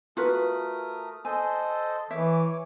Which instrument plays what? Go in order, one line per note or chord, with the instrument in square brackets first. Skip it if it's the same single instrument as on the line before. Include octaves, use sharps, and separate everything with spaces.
[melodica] A3 A#4 D#6 [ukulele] F4 F#4 B4
[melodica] A4 C5 D#5 [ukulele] G#5
[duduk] E3 [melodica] C#5 D6 [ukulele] E5